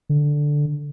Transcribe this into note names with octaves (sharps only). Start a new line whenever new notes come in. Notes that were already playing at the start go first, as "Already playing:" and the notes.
D3